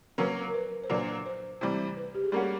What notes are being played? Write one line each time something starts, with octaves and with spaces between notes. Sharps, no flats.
F#3 A#3 C#4 B4
A#4
B4
C5
A#2 F#3 A#3 D4 B4
C5
C3 E3 G3 C5
B4
G4
G#4
G3 A#3 C#4 F#4 A4